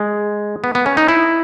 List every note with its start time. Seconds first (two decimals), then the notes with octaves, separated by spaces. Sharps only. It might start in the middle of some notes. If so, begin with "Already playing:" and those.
Already playing: G#3
0.64 B3
0.75 B3
0.86 C#4
0.97 D#4
1.08 E4